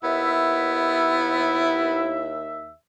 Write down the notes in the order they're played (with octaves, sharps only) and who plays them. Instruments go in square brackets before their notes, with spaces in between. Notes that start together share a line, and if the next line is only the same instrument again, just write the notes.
[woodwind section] D#2 E5 [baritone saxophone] B3 [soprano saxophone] E4